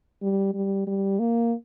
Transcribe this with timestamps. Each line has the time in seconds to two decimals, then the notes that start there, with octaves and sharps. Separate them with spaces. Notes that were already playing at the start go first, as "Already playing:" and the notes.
0.22 G3
0.54 G3
0.87 G3
1.19 A#3